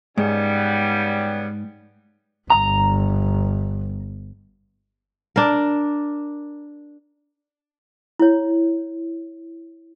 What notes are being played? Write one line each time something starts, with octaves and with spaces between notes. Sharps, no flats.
G#2 C#3 G3 B3
G1 A#5
D4 A#4
E4 C#5